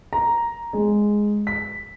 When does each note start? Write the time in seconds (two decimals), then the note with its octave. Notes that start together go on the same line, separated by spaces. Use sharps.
0.13 A#5
0.73 G#3
1.47 B6